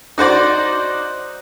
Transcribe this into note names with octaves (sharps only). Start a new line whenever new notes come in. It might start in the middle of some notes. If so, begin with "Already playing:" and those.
D#4 F#4 C5 D5